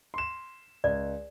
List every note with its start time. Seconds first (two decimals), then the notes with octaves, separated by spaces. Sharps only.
0.14 C6 E7
0.84 C#2 D5